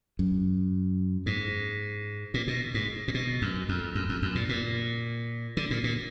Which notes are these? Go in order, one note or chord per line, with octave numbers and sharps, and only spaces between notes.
F#2
G#2
A#2
B2
G#2
A#2
B2
F#2
F2
F#2
F2
F#2
A#2
A#2
D3
A#2
A#2